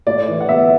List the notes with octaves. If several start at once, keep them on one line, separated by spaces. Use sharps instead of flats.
A2 D5
E3
F#5
B3 E5